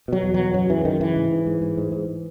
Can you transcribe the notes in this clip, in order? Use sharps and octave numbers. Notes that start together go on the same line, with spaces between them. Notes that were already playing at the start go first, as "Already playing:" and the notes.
B2 F#3
E2
B2 F#3
F#2 F#3
C#3 E3
F#2 D#3
C#3 E3
G#2
G#2
G#2
G#2
G#2
G#2